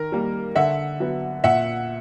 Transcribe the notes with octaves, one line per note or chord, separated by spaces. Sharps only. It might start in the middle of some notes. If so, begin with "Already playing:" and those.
Already playing: D#3 A#4
G3 A#3
D3 E5 F#5
F#3 B3
A#2 E5 F#5